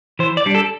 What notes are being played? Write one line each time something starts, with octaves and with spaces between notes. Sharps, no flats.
E3 C5
D5
G3 D4
A4